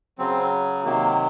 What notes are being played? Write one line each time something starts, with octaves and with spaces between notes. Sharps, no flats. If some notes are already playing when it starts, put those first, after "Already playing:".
C#3 F#3 C4
C3 D#3 F#3 A#3